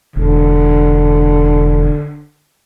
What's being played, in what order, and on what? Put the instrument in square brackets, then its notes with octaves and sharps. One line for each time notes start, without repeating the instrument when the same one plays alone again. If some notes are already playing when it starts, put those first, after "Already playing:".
[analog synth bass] E1 [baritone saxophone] D3